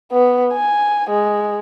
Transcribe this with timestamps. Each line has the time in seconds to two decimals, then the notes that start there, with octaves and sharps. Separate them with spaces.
0.12 B3
0.54 G#5
1.10 G#3